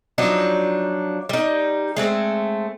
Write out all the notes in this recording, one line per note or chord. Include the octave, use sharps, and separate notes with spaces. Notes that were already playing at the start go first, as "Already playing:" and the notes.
F3 F#3 D4 D#4
G3 D#4
G#3 A3 C4